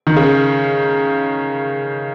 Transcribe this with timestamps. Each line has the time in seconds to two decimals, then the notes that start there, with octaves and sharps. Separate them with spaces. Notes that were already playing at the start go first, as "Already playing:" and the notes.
0.07 D#3
0.16 C#3